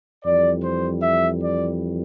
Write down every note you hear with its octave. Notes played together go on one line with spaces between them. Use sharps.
F2 E3 G3 D5
C5
E5
D5